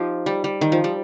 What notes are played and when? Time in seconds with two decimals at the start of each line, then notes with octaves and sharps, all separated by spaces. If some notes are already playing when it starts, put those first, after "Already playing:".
Already playing: F3 D#4 F4 G4
0.26 G3
0.44 G3
0.61 D#3
0.72 F3
0.84 G3